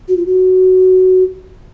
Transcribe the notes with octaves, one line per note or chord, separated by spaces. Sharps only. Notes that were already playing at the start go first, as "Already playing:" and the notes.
F#4
F4
F#4